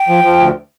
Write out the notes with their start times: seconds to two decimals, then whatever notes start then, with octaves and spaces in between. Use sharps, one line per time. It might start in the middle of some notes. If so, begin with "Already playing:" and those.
Already playing: G5
0.09 F3
0.24 F3
0.40 D2